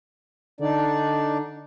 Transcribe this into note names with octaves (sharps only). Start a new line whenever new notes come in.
D3 D4 D#4 D5